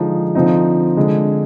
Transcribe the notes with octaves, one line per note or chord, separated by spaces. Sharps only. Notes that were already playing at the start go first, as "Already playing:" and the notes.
Already playing: D3 F3 G#3 D#4
D3 F3 C4 D#4
D3 G#3 D4